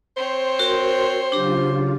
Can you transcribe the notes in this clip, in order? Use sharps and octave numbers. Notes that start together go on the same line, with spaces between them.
C4 C5 C#5
F#4 A#4
C#3 F#3 D4 F4 G4